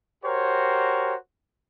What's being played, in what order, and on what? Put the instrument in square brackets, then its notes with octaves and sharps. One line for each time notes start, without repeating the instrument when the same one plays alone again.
[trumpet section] F#4 G4 A#4 C5 C#5